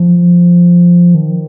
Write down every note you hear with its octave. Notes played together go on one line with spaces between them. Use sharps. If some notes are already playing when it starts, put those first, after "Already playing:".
Already playing: F3
D#3